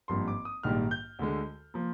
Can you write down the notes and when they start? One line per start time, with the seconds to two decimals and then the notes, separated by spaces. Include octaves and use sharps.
0.08 G#1 G2 F3 A#3 C6
0.28 D6
0.45 D#6
0.63 A#1 G#2 D#3 G3 A#3 F6
0.91 G6
1.19 D2 D3 G#3
1.74 F3 A#3